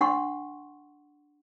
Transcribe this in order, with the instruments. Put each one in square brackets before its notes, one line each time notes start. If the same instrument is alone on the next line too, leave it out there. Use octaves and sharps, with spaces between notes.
[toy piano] D4 F#5 C6 C#6